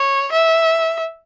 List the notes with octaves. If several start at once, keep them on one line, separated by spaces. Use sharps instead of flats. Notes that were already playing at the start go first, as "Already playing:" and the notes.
Already playing: C#5
E5